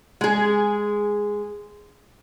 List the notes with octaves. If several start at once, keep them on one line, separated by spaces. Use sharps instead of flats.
G#3 G#4